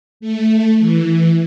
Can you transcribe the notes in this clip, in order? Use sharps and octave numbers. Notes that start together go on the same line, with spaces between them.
A3
E3